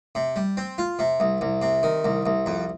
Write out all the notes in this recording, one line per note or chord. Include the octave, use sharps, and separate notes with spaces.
C3
G3
C4
F4
C3
C2
C2
C3
D#3
C2
C2
F2